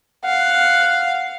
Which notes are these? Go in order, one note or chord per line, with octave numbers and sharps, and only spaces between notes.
F5 F#5